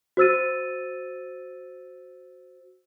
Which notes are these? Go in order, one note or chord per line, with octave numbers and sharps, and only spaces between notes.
F#4 C5 E6 A6 D#7